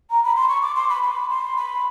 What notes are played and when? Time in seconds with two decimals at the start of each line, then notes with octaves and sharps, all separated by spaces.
0.10 A#5
0.24 B5
0.36 C6
0.49 C#6
0.62 D6
0.75 C6
0.89 B5
1.02 B5
1.29 C6
1.57 B5